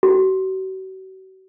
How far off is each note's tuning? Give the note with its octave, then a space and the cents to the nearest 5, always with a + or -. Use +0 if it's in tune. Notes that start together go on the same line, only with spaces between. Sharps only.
F#4 +40